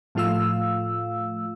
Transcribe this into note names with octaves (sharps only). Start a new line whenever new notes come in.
A2 F3 A3 F4 F5 E6